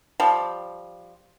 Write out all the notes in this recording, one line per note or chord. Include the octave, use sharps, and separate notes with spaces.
F3 G3